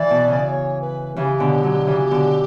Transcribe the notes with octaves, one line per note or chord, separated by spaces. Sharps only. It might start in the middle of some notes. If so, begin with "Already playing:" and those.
Already playing: E3 D5
B2
C#3
D5
C#5
B4
C#3 E3 G4
B2 D3
D3 F#3
C#3 E3
B2 D3